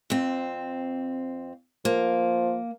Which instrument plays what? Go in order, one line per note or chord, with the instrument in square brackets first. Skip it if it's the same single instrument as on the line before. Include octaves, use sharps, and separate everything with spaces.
[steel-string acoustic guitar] F2 C4
[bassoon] F3 [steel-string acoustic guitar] A#3